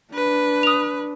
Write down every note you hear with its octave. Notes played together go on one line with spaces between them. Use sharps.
D4 B4
D#6 F7